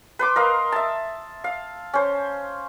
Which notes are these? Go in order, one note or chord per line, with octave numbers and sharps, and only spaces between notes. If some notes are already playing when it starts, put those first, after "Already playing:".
B4 C6 D6
A#4 D#5 F5
E5 A5
F5
C#4 C5